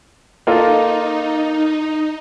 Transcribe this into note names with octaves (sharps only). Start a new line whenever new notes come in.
A#3 D#4 F4 A4